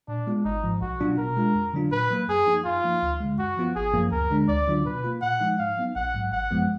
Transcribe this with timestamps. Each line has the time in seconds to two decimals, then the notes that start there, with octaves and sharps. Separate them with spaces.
0.08 A#2 D4
0.27 G#3 B3 F4
0.45 G#1 D#4
0.64 G#2 F3
0.81 B1 F#4
1.00 B2 F#3 D4 F4
1.18 B2 A#4
1.37 G#3 D4 F4
1.55 F2
1.74 D3 F#3 D4 F4
1.92 A#2 B4
2.10 F#3 A#3
2.28 F#2 G#4
2.46 F3 A#3 D#4
2.65 F#2 F4
2.84 F3 A#3 D#4
3.02 D2
3.20 D3 G#3
3.39 F#2 F#4
3.57 F3 B3 F4
3.76 G#1 G#4
3.94 F#2 F3 A#3
4.12 D2 A#4
4.30 D3 G#3 D4
4.48 D2 D5
4.67 D3 F#3 D4 F4
4.86 B2 B4
5.04 A#3 F4
5.22 A#2 F#5
5.41 F3 G#3 D#4
5.59 G#2 F5
5.77 F#3 B3 D#4
5.96 A#1 F#5
6.14 G#2 F#3
6.32 G#1 F#5
6.51 F#2 F3 G#3 B3